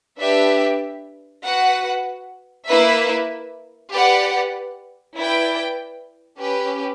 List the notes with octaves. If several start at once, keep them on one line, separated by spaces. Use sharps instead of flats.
D4 G4 B4 E5
F#4 B4 F#5
A#3 E4 B4 E5
G4 B4 D5 F#5
E4 B4 D5 G5
C#4 G4 B4